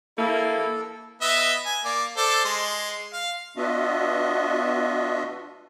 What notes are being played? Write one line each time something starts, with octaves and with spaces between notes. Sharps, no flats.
A#3 E4 A4
B3 D#5 E5
G#5
A#3 D5
A4 C5 D5
G#3 C6
F5
B3 D4 F4 F#4 D#5 E5